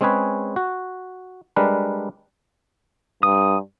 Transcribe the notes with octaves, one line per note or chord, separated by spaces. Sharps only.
G#3 C4 C#4 G#4 B4 C#5
F#4
G3 G#3 D4 A#4 B4
G2 D#6